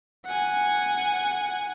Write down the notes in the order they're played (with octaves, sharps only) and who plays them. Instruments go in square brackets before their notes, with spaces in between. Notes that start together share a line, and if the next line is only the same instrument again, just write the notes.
[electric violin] F#5 G#5